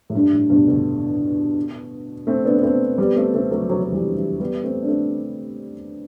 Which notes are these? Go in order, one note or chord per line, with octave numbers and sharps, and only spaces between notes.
A2
G2
A2
G2 B2
B2 D3
A3 C4
B3 D4
B3
A3 C4
G3 B3
A3 C4
A3 C4
F#3 A3
F#3 A3
F#3
E3 G3
E3 G3
G3 B3
A3 C4
D4
A3 C4